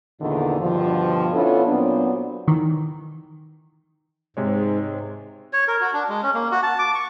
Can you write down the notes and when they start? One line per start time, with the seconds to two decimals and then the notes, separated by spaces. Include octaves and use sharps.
0.21 E2 A#2 D3 D#3
0.60 G2 B2 D3 F3
1.34 B3 C#4 D4 E4 F4 A4
1.67 A#2 F#3 B3 C4 D4
2.48 D#3 E3
4.37 G#2 C3 G#3 C#5
5.53 C#5
5.68 A#4
5.81 F#4
5.93 D4
6.09 G#3
6.23 C#4
6.34 A#3
6.52 F#4
6.63 A5
6.79 D6
6.95 C#6